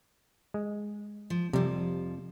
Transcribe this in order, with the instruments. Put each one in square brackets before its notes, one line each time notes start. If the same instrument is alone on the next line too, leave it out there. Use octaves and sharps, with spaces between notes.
[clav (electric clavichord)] G#3
[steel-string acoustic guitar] F3
[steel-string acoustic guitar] F2 F3 [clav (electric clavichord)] C3 G3